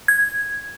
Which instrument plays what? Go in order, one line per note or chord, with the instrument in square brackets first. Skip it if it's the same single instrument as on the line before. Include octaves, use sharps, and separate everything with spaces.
[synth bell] G#6